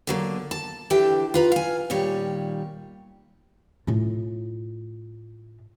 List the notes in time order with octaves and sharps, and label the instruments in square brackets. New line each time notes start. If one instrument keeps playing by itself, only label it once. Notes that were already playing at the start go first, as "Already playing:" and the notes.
[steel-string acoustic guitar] D3 F#3 A#3
A5
D3 E3 G4 E5 G5
F4 B4 A#5
F5 G#5
A#2 D#3 G3 C#5
[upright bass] A2 F4